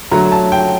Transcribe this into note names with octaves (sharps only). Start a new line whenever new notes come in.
D3 F#3 A3 A#5
A5
G5